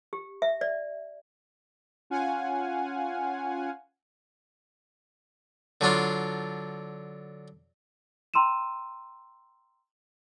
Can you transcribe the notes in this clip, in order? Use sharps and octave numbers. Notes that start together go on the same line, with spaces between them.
G4
E5
D5
C#4 F4 F5 F#5 G#5
D3 F#3 D4 F4
G5 A#5 C6 E6 D#7 E7